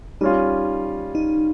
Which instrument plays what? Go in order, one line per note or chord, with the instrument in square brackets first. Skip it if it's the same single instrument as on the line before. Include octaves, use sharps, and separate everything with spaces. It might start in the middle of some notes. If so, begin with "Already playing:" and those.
[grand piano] G3 C#4 F4 [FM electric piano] D#4
[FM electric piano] D#4